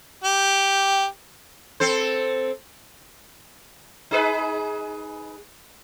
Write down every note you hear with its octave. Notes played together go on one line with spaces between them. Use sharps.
G4
C4 A4 C5
D#4 G#4 B4